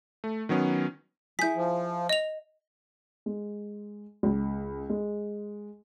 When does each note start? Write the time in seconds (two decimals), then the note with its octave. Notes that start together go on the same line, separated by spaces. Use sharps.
0.24 A3
0.49 D#3 F#3 B3 C#4
1.39 E4 G#4 G6 B6
1.56 F3
2.09 D#5 F7
3.26 G#3
4.23 C#2
4.90 G#3